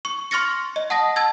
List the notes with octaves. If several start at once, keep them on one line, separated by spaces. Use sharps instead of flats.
C#6
C6 C#6 F6 A6 A#6 C#7
D#5
F#5 A5 D#6 A#6
A5 E6 G#6 A6